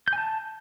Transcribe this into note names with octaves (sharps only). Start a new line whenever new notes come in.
G6
G#5
A5